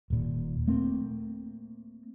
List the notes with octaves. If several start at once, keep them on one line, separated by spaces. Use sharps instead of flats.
D#1 A#2
A3 A#3 C4